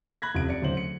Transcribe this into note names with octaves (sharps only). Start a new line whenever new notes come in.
B5 F#6 G#6 A#6
F1 C#3 D7
D5 C#7
D1 D2 C#3 C5 F#7
C#7